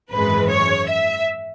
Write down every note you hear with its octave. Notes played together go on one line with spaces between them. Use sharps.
G#1 F#2 E3 G#3 B4
C#5
E5